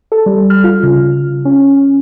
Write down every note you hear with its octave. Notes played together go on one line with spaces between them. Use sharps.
A4
G3
F6
F4
C#3
C#4